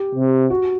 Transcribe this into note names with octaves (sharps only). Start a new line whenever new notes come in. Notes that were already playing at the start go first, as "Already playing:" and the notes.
Already playing: G4
C3
F#4